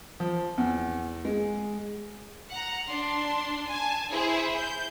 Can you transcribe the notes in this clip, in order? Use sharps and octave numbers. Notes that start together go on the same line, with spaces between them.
F3
E2
G#3
F#5 A#5
D4 C6
G#5 A5
E4 G#4 C5
G6